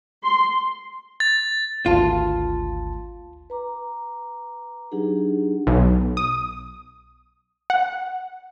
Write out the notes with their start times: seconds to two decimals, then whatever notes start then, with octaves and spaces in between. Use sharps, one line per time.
0.24 C6
1.20 A6
1.86 G#1 D2 F4 A5
3.50 B4 A#5 D6
4.92 F#3 D4 D#4 G4 G#4
5.67 B1
6.17 D#6
7.70 F#5